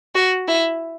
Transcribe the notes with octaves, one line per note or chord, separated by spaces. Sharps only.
F#4
E4